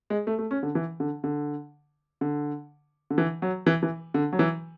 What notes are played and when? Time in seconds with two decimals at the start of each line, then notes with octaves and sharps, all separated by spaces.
0.10 G#3
0.27 A3
0.39 A3
0.51 C#4
0.63 D3
0.75 E3
1.00 D3
1.24 D3
2.21 D3
3.10 D3
3.18 E3
3.42 F#3
3.66 E3
3.83 E3
4.14 D3
4.33 F#3
4.39 E3